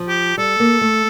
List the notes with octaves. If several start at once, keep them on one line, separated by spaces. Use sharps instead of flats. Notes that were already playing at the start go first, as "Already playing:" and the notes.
Already playing: F3
G4
G3 A4
A#3
A3